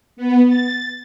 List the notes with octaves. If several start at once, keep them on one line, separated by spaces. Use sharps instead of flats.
B3
A6